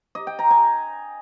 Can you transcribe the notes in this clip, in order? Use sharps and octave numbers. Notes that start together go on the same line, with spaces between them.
D#5
G5
A#5
G#5